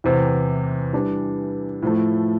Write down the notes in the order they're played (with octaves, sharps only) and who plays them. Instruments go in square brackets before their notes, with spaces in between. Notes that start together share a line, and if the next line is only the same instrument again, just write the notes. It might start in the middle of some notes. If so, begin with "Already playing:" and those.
[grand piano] E2 C3 E3
E3 G3 D4
A2 F3 A3